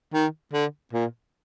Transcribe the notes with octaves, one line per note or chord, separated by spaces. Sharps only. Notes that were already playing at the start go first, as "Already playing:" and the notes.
D#3
D3
A#2